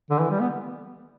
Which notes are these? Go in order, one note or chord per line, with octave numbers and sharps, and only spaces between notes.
D3
E3
G3
B3